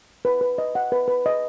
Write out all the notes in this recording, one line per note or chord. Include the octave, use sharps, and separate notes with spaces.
B4
B4
D#5
F#5
B4
B4
D#5